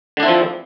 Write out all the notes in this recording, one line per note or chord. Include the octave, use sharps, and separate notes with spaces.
D3 F3 C4 D4 E4